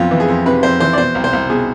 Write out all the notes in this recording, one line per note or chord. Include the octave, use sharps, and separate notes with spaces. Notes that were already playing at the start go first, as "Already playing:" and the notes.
Already playing: B1 F2 F4
E3
G#4
F2
C3 B4
F2 C5
E3 C5
D5
B2 C5
C2
C5
C2
B2 G#4